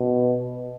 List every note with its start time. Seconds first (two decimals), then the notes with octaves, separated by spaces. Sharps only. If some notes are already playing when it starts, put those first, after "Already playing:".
Already playing: B2